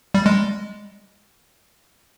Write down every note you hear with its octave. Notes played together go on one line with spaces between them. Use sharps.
G3
G#3